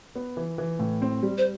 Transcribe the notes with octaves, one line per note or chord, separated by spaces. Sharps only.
B3
E3
E3
A2
C4
G3
C5